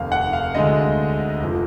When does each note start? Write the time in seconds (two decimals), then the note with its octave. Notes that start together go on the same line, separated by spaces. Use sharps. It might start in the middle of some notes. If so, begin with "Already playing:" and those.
Already playing: F1 D#2 D#3 F5
0.12 F#5
0.33 F5
0.54 D2 D3 G#3 D#5
1.40 F1 F3